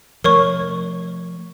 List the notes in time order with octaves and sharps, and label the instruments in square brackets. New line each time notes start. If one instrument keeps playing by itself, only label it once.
[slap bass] F3 A3 [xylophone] A#4 C#5 C#6